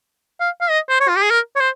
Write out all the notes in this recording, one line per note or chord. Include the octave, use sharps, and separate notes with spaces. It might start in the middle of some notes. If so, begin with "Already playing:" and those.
F5
F5
D#5
C5
C#5
F4
G4
G#4
A#4
C#5
C5